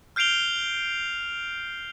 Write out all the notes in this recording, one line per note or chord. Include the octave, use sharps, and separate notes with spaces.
F6 G6 C7 D7 F7 G7